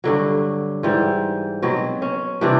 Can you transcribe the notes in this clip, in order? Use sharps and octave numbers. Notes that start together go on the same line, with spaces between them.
G2 D3 F#3
G#2 E3 G3
B2 F#3 C4
C#4
C3 E3 G3 D4